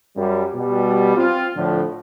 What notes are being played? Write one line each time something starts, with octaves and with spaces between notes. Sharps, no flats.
F#2 G3
B2 G3
C4 F4
A2 D3 F3